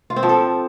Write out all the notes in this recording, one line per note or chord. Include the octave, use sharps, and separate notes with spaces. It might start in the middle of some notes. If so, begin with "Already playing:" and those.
F4
C4
F3
A4